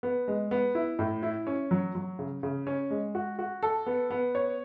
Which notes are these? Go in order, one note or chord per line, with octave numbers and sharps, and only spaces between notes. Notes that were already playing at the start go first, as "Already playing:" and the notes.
B3
G#3
B3
E4
A2
E4
C#4
F#3
F#3
C#3
C#3
C#4
G#3
F#4
F#4
A4
B3
B3
C#5